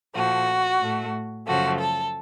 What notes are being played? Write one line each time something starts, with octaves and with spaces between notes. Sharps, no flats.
A#2 F3 A3 F#4
A2 A3
F#2 C#3 F3 A3 F#4
A4